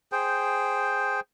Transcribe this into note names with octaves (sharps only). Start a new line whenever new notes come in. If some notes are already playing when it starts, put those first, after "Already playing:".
G#4 C5 G5